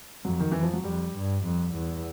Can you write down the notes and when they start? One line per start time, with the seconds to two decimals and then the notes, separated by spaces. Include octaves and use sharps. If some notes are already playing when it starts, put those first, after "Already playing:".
0.24 F2 F#3
0.40 D#3
0.52 F2 E3
0.63 F3
0.73 F#3
0.84 F2 G3
1.15 G2
1.44 F2
1.75 E2